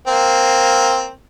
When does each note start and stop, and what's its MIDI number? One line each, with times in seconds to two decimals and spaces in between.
0.07 1.09 58
0.07 1.09 60